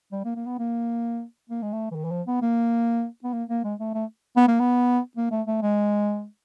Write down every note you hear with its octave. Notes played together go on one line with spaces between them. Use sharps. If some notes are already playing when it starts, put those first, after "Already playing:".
G3
A#3
A#3
B3
A#3
A#3
G#3
A3
E3
D#3
E3
F3
B3
A#3
B3
A#3
A#3
G#3
A3
A3
B3
A#3
B3
A#3
A3
A3
G#3